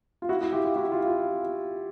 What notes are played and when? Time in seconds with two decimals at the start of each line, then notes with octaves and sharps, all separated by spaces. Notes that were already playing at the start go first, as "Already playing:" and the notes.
0.22 F4
0.29 E4 F#4
0.41 E4 F#4
0.53 F4 G4
0.64 F4 G4
0.76 E4 F#4
0.92 F4
1.08 F4